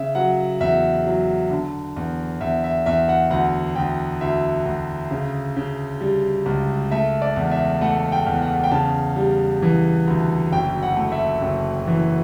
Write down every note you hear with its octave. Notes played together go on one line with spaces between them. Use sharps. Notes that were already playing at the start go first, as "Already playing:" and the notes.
Already playing: C#3 E5
F#3 F#5
E2 E5
F#3
D3
E2
E2 E5
E5
E2 E5
F#5
D2 F#5
D2 G5
D2 E5
D2
C#3
C#3
G3
C#2
A3 E5
D5
E2
E5
A3 F#5
G5
E2
F#5
G5
C#3 A5
G3
E3
D2
F#1 G5
F#5
A3
E5
F#1
E3